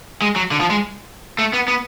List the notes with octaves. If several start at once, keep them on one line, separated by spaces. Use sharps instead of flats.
G#3
F#3
D3
F3
G#3
A3
B3
B3